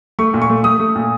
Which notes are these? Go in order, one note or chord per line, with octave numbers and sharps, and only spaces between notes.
A3 C#6
A#2
C#6
A3
A3 D#6
A3
A#2